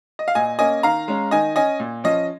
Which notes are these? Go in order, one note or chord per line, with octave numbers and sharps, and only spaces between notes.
D#5
F5
A#2 D#5 G#5
A#3 C#4 D#5 G#5
D#3 F5 A#5
G#3 C#4
D#3 D#5 G#5
C#4 D#5 G#5
A#2
F3 C#4 D#5